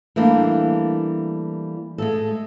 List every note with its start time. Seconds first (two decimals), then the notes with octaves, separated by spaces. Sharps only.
0.16 E3 G3 A3 A#3 D4
1.98 G#3 A3 A4